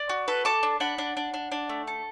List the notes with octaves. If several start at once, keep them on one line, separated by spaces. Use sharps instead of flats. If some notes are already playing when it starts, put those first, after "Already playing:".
Already playing: D5
F#4
A4 B4
A4 A5 D6
D4
D4 F#5 B5
D4
D4
D4
D4
A3
A4